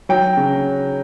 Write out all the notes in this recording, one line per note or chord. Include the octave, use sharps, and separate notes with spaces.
F#3 G5
C#3